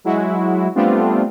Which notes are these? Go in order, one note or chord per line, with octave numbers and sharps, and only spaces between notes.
F#3 G#3 E4 F#4
G3 A3 B3 C4 D4 F4